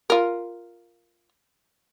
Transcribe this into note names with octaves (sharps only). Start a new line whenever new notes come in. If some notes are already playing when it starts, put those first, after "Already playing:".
F4 A#4